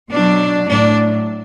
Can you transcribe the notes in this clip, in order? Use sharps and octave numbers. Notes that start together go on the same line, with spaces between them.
B2 F#3 D4
A2 F#3 D4